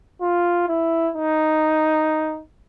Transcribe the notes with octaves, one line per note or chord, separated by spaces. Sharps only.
F4
E4
D#4